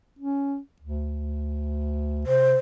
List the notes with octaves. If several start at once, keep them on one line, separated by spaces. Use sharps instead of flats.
C#4
D2
C3 C5